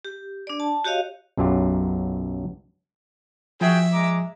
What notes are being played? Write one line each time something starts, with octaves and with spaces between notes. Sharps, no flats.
G4
D4 D5
A5
F#4 G4 C#5 D#5 F5
B1 F#2 F#3 F4 G4
F3 F#4 G#4 E5 G5
G#3 A#5 D6